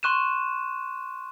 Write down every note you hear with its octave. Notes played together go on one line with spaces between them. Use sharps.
C6 C#6 F#6 D#7 E7